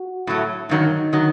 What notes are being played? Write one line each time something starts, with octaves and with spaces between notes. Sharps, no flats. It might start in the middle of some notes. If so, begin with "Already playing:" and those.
Already playing: F#4
A2 F#3 A3
G2 D#3 F#3 D#4
D#3 F#3